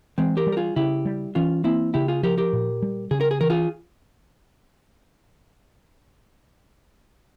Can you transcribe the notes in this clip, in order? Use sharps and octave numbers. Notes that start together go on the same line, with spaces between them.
E3 G#3 C4
G4 A#4
G3
A#4
F4 G#4
C#3 E4 G4
G3
E3 C#4 F4
A#3 C4 E4
C#3 E4 G4
F4 G#4
F3 G4 A#4
G4 A#4
A#2
G3
C#3 G#4
A#4
G#4
E3 A#4
F4 G#4